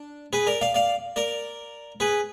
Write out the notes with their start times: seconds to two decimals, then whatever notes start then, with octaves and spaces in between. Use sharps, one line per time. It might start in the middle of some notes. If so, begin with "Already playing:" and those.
Already playing: D4
0.33 G#4 B4
0.47 A#4 D5
0.61 D5 F5
0.74 D5 F5
1.16 A#4 D5
2.00 G#4 B4